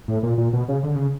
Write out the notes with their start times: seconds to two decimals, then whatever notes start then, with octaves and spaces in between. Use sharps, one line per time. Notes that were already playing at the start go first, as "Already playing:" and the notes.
0.08 A2
0.23 A#2
0.38 A#2
0.53 B2
0.68 C#3
0.83 D3
0.96 C#3